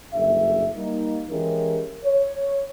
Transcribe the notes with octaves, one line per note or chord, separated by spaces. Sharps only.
F#1 B1 G2 D3 E5
G3 A#3 D#4
E3 G#3 C#4 E4 G4 A#4
C#5